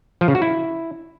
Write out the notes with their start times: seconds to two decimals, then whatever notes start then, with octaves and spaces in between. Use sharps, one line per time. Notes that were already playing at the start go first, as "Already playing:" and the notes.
0.21 F3
0.28 C#3
0.35 F#4
0.42 E4